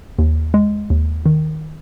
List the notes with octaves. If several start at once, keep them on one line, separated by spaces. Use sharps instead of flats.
D#2
G#3
D#2
D#3